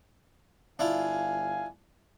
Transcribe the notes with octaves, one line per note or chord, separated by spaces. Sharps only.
G1 D4 E4 F4 F5 G#5